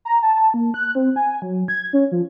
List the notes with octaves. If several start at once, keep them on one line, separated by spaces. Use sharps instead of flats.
A#5
A5
A#3
F#6
C4
G#5
F#3
G#6
C#4
F3